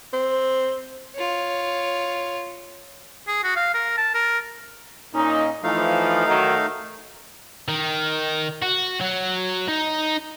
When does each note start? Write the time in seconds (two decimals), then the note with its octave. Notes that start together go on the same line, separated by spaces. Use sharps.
0.13 C4
1.15 F4 C#5
3.27 G#4
3.43 F#4
3.56 F5
3.74 A#4
3.97 A5
4.14 A#4
5.14 A#2 C#4 D#4
5.63 E3 F3 A3 D#4 F5
6.26 D#3 F#3
7.68 D#3
8.62 F#4
9.01 F#3
9.68 D#4